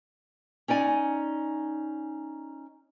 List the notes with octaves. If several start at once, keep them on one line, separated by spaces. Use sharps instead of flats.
C#4 D#4 D5 G#5